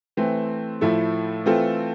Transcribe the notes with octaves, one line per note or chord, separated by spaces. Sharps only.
E3 A3 C4
A2 F3 A3 E4 A4
E3 A3 C4 F4 A4